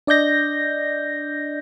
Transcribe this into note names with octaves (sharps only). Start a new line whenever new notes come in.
D4 D5 D#5 G6 A#6